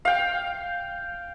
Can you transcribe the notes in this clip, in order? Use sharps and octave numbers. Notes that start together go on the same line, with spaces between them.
F5 G5